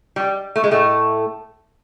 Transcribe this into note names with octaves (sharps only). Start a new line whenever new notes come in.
G3
A3
G#3
A2 A3